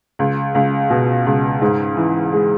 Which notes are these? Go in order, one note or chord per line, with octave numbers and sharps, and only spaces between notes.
C#2
C#2
B2
C#2
G#2
E3
G#3